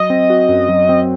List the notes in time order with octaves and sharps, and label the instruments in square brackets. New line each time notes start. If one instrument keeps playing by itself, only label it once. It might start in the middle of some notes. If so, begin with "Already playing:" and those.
Already playing: [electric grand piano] F#3 [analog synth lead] D#5
[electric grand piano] C4
F#4
F#2
F#3
C4